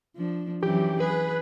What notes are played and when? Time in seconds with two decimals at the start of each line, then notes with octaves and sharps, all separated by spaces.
0.16 F3 D4
0.63 F#2 E3 F#3 G4
1.00 G#4 B4